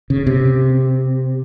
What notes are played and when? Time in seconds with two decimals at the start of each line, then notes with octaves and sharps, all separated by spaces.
0.10 C#3
0.27 C3